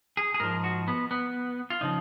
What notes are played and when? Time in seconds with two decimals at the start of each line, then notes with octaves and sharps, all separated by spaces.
0.17 G#4
0.34 G#4
0.40 G#2 F3 A#4
0.64 F#4
0.88 B3
1.11 B3
1.70 F4
1.81 C#3 F3 D#4